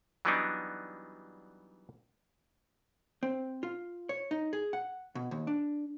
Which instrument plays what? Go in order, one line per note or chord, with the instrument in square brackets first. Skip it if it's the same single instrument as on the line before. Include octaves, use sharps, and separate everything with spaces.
[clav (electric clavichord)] E3 F#3 G3 B3 D4 D#4
[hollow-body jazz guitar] C4
F4
C#5
D#4
G#4
F#5
B2
D#2
D4